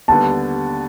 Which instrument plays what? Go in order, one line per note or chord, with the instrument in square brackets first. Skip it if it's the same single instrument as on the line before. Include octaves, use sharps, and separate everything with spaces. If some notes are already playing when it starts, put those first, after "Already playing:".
[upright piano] D#2 D3 G3 B3 [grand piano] A5